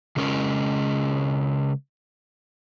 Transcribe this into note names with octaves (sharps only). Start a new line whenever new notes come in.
C#3 G#3 C#4 A#4